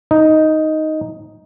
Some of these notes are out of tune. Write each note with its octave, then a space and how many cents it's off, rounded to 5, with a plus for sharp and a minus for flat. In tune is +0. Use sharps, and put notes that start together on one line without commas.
D#4 +5